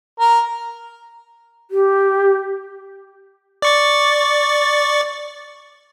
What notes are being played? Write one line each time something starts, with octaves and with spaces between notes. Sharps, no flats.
A#4
G4
D5 C#6 A6